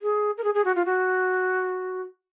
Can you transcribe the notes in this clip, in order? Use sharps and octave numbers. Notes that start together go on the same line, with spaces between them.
G#4
A#4
G#4
G#4
F#4
F4
F#4